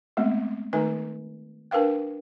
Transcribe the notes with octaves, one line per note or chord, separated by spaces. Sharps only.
G#3 A3 B3 C4
D#3 A3 D#4 B4 G#5
D4 A#4 B4 F5 G5